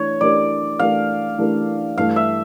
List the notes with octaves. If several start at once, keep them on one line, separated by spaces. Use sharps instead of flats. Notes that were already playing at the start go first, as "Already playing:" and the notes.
Already playing: E3 A3 D4 C#5
E3 A3 D4 G4 A#4 D5
E3 A3 D4 G4 A#4 F5
E3 A3 D4 G4 A#4
G2 E3 A3 F5
E5